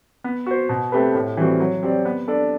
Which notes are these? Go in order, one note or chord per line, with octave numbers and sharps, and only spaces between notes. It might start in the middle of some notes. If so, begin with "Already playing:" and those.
B3
F#4 C5
B2
A3 C4 G4 B4
A2
E3 G3 C4 F#4
F#3
C4 G4 D5
B3
D4 A4 D5